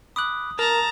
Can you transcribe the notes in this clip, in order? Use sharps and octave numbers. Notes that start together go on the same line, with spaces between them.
B5 D6 D#6 F#6
A#4 A5 A#5